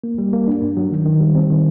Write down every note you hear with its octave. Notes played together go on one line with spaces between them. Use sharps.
A#3
G3
A#3
D4
G2
F#3
D#3
D#3
G3
C4
D#3